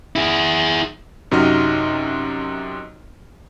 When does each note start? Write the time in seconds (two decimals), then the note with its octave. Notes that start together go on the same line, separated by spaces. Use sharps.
0.16 E4 G#4
1.31 F#2 C3 D#4 F#4 D#5 F6